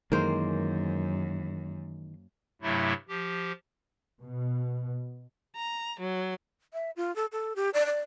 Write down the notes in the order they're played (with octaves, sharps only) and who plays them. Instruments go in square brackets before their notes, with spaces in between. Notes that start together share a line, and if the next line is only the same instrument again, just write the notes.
[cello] F#2 [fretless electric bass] D#3 E3 G#3 [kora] A#3 C5
[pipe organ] G2 C3 F#3 A3 E4
F3 G4
[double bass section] B2
[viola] A#5
F#3
[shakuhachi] E5
F4
A4
A4
G4
D5
D5